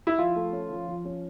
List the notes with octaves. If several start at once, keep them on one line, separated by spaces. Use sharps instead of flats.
E4
F3 F4
A3
C#4
F3
F3
C#4